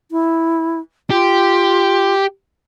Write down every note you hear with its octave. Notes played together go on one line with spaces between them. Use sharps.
E4
F4 G4